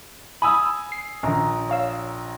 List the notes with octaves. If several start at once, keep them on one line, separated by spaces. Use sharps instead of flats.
G#5 B5 D#6 E6
C7
A#1 D#3 C#4 A#5
C#5 F5 E6